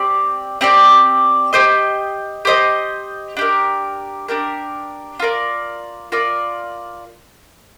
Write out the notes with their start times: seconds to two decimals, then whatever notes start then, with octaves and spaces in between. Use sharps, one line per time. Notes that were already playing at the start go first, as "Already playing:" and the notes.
Already playing: C4 G4 D5
0.61 C4 G4 D5
1.53 G4 C5 D#5
2.45 G4 C5 D#5
3.37 D4 G4 A#4
4.28 D4 G4 A#4
5.20 F4 A#4 D5
6.12 F4 A#4 D5